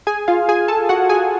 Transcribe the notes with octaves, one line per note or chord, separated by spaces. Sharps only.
G#4 G#5
F4 F5
G#4 G#5
A4 A5
F#4 F#5
G#4 G#5